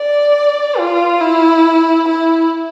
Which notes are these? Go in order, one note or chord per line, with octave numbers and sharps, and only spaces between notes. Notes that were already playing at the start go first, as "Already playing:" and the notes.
Already playing: D5
F4
E4
E4